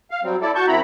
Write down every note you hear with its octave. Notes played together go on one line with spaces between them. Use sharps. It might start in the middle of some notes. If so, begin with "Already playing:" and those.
F5
F#3 G3 C4
E4 A4 D5
F#4 A5 C#6 G6
F#2 C4 E4 A#5 B5